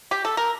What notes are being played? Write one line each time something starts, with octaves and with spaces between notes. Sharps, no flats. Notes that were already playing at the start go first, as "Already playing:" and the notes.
G4
A4
A#4